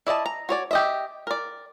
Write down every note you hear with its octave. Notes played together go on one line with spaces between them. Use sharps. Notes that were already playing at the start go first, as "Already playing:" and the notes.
E4 D5 D#5 A5
A#5
F#4 C#5 D5
G4 D#5 E5
A#4 D5